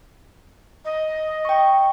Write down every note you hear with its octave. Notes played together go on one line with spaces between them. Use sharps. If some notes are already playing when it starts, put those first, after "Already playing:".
D#5
G5 C#6